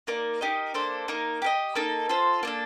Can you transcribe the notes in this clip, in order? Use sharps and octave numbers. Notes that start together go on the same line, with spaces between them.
A#3 D#4 A#4 D5
D#4 G4 A#4 D#5
A#3 D4 A4 C5
A#3 D#4 A#4
G4 A#4 D#5
A#3 D#4 A4
F4 A4 C5
A#3 D4 A4